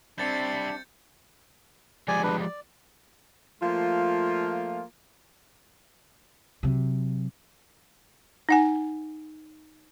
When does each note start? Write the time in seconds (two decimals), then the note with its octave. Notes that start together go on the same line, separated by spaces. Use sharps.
0.18 G3 C4 D4 E4 G6 A6 C#7
2.08 F3 G#3 G4 D5 G#5
2.23 D4 B4
2.40 D5
3.62 F3 A3 A#3 F4
6.63 C3 F#3
8.49 D#4 F#5 G#5